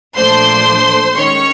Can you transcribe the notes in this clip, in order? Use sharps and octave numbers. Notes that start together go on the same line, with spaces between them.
A#2 F3 A3 D4 C5 C6
D#3 G#3 C#4 C#5 C#6